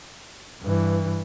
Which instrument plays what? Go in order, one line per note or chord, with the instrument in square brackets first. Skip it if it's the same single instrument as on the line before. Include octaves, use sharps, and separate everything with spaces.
[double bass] G2 E3